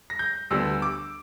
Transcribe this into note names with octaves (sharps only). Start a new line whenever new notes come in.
A#6
G6
D2 D3 G3 B3 E6
D6